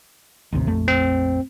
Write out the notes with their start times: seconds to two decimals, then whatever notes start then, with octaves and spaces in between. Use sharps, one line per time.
0.52 A1 D#2 C3
0.67 A#1 F2 A3
0.88 C4